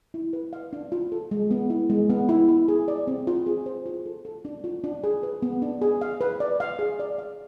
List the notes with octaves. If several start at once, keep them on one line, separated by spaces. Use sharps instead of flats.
E4
B4
F5
D4
F4
A4
G#3
B3
E4
G#3
B3
E4
E4
G#4
D5
C4
F4
G#4
C5
F4
A4
A4
D4
F4
D4
G#4
B4
B3
D4
G#4
F5
B4
D5
F5
G#4
D5
F5